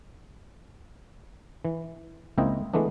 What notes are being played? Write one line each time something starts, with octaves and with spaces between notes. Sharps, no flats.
E3
C#2 A#3 C4 E4 D#5 G5
E3 G#3 A3 B3 D4